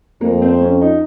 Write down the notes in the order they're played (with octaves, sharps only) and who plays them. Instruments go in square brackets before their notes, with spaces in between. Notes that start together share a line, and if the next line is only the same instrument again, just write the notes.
[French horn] F2 [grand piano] A#3
[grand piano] C4
C#4
D#4